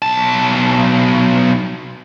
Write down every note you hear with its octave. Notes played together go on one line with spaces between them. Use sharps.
B1 A5